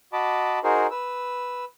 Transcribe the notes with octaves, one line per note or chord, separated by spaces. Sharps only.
F#4 D#5 A5 B5 D6
D#4 F#4 G#4 A#4 C5
B4 E6